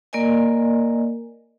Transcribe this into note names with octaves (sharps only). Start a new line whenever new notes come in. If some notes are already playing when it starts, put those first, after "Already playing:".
A#3 A#4 D5 D#5 G#5